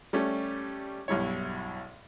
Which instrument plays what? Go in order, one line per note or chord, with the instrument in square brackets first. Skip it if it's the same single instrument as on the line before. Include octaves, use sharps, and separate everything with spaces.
[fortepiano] G3 A3 C#4
B1 G2 E4 C#5